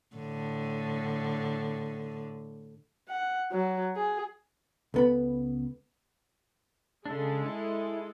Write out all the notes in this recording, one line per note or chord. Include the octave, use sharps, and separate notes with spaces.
A2 D3
F#5
F#3
G#4
C#2 B3 A4 B4 B5
C#3 G#3 D4 A4
E4